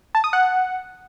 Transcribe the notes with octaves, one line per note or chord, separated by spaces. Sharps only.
A5
D#6
F#5